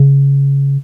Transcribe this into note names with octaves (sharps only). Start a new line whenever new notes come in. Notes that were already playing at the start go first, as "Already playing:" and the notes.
Already playing: C#3